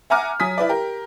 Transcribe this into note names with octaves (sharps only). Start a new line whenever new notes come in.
E5 F#5 G#5 A#5 D6 F6
F#3 G#5 D#6 B6
E4 B4 D5
G4 A#4